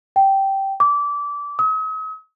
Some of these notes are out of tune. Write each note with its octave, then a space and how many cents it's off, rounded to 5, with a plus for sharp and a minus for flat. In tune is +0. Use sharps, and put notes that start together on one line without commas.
G5 -10
D6 -20
D#6 +45